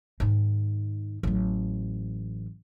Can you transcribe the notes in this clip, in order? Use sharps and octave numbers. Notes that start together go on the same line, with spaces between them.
G#2 D#3
A1 F#3